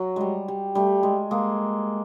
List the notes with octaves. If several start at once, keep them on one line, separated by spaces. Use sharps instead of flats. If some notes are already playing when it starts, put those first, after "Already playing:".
Already playing: F#3
G3 G#3
G3
G3 A3
G#3
G#3 A#3